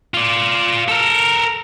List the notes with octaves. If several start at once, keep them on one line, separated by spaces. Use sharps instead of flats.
F4 D5
A4 A#4